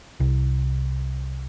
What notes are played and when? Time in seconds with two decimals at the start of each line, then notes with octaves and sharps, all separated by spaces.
0.20 C2